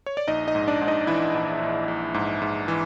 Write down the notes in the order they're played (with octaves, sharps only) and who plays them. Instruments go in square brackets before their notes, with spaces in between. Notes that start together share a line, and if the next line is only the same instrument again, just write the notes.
[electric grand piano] C#5
D5
A#1 D#4 D#5
D#4 D#5
G#2
D4 D5
G#2
D#4 D#5
E3 E4 E5
A#1
A#1
A#1
G#2
G#2
E3